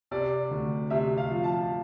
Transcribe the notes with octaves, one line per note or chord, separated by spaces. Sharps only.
C3 D5
D2
C3 E5
F5
F3
A5